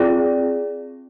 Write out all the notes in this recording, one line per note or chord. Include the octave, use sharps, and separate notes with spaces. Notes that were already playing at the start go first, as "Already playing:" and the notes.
Already playing: C4 F4 G#4 D5 G5